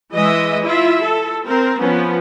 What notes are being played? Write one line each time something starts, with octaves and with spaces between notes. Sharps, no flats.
E3 G#3 D#5 E5
E4 F4 E5
A4
C4 A#4
F3 B3 C#4